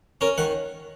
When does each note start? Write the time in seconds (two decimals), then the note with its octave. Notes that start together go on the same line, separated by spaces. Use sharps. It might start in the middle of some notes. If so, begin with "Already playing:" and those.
0.21 C#4 A#4
0.38 D#3 F#5